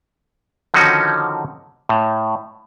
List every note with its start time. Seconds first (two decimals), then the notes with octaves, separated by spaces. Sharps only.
0.74 D3 D#3 F3 C#4 D#4 F#4
1.89 A2